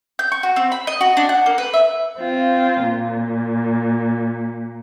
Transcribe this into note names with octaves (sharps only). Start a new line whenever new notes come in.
G6
C#6
F#4
C4
B5
D#5
F#4
D4
F#5
A#3
B4
E5
C4 F4
A#2